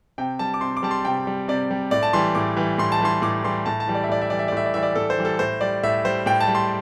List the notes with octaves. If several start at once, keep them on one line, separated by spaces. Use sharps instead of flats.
C3 G5
G3 A5
D6
C3 C6
D6
G3 A5
C6
C3 G5
G3
C3 D5
G3
A2 D5
A5
E3 G3 C6
A2 D6
E3 G3
A2 C6
A5
E3 G3 C6
A2 D6
E3 G3 C6
A2 A5
A5
E3 G3
D5
E5
A2 D5
E5
E3 G3 D5
E5
D5
A2 E5
D5
E3 G3 E5
D5
A2 A4
C5
E3 G3
A4
A2 C5
G3 D5
A2 E5
G3 C5
A2 G5
A5
G3
C6